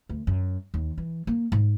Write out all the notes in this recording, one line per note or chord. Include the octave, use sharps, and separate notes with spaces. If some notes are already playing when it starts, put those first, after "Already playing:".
D2
F#2
D#2
E3
A#3
G#2